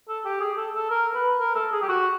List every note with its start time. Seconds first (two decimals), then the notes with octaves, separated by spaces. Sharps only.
0.08 A4
0.25 G4
0.40 G#4
0.57 A4
0.74 A4
0.90 A#4
1.14 B4
1.39 A#4
1.55 A4
1.72 G#4
1.82 G4
1.88 F#4